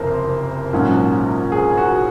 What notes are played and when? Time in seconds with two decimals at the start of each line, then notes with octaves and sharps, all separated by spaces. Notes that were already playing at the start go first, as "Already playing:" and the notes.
Already playing: F#1 F2 C3 F3 A#4 C5
0.73 A#1 G#2 F#3 A#3 C#4
1.52 G#4
1.78 F#4